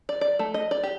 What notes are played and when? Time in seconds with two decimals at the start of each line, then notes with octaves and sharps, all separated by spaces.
0.09 D5
0.21 D5
0.39 A3
0.54 D#5
0.71 D5
0.83 G4